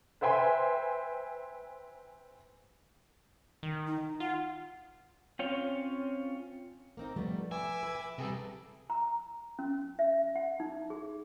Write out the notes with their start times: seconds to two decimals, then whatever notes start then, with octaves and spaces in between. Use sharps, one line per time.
0.21 B4 C5 E5 G5 G#5 C6
3.63 D#3
3.87 D#4
4.20 F4 F#5
5.39 C4 C#4 F4 C#5
6.97 A#3 C4 D#4
7.16 F3 G3 A3 B3
7.52 B4 E5 G#5 D6 E6
7.83 B4
8.18 C3 G3 G#4 A4
8.90 A#5
9.59 C#4
9.99 E5
10.35 F#5
10.60 D#4
10.90 G#4